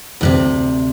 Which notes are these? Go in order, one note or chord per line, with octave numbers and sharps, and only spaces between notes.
D2 A2 C3